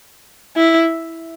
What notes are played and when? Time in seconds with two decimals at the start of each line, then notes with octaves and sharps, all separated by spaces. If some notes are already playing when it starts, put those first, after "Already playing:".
0.57 E4